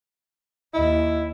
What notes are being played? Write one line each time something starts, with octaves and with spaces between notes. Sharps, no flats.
D#2 E4 D#5